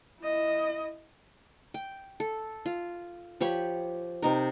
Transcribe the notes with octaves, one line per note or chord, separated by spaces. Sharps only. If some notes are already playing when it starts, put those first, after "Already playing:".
E4 D#5
G5
A4
F4
F3 G4 C#5 B5
C3 D#4 A#4